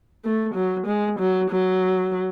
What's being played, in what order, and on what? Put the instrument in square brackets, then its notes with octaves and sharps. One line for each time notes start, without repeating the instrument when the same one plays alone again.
[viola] A3
F#3
G#3
F#3
F#3